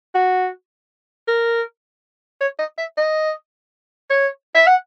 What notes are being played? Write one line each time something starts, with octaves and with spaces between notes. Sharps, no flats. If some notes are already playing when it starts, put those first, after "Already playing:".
F#4
A#4
C#5
D#5
E5
D#5
C#5
E5
F#5